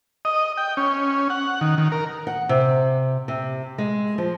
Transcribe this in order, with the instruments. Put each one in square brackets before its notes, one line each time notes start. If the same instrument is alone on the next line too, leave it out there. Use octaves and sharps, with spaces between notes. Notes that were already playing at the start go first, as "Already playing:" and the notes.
[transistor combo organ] D#5
G5
C#4
F#5
D#3
D#3
A#4
[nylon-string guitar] F#5
C3
C3
G#3
F3